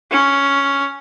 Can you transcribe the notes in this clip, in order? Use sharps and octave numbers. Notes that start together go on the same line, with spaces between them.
C#4